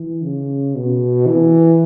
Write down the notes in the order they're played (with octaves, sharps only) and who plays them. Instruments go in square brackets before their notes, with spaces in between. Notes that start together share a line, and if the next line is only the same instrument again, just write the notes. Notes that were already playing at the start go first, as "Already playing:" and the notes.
Already playing: [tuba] E3
C#3
B2
E3